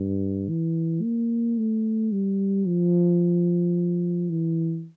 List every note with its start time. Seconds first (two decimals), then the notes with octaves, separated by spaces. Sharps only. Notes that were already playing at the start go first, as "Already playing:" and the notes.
Already playing: G2
0.49 E3
1.03 A#3
1.58 A3
2.12 G3
2.67 F3
4.30 E3